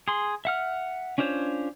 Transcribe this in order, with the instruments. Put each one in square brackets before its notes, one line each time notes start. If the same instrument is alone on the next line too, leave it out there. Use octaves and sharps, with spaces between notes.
[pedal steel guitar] G#4 C6
E5 F#5 F6
C#4 D4 F4 C5 C#5